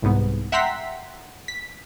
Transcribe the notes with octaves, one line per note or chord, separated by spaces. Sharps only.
C2 G#2 B3
E5 F#5 G5 A#5 C6 B6
B6